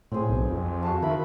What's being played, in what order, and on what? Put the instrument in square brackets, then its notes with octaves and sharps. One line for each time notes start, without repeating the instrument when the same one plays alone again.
[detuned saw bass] A2 [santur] C4 G#4
[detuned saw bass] B1
F2
[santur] F#4 F5 A5
[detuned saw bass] D#3 [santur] E4 B5